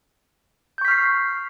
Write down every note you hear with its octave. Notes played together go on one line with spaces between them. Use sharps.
C#6 F6 G6 B6 C7